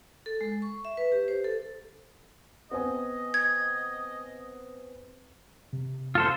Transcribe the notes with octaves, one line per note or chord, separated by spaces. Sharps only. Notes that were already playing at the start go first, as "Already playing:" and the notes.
A4
G#3
C#6
E5
B4
G4
C5
A4
B3 C4 D#5 G#5
G#6
C3
F4 A4 C5